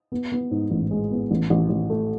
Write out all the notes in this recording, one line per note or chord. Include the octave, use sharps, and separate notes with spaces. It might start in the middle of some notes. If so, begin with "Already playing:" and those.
B3
B3
G#2
A1
G#3
B3
A1
A1
A1
A3